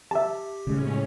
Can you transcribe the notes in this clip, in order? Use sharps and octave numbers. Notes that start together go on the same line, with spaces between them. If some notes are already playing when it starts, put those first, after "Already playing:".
G4 E5 A5
A2 C#3 G#3 C#4